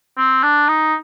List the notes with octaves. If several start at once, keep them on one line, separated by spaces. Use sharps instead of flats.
C4
D4
D#4